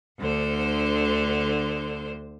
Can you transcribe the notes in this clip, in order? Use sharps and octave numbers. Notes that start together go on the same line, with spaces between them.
D2 D3 C5